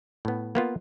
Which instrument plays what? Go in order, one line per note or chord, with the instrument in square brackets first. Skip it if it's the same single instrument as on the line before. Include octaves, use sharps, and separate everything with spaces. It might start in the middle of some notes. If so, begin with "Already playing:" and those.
[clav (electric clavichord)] A2 B3
A#3 B3 F4